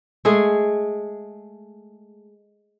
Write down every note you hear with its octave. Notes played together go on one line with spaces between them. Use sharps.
G#3 A3 G#4